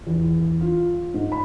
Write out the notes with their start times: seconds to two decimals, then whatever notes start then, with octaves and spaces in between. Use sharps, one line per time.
0.07 E2
0.61 F4
1.14 G#2
1.32 B5